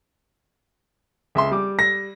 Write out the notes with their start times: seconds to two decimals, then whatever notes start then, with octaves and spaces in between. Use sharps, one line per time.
1.35 C#2 E5 C6
1.51 G3 D6
1.79 A#6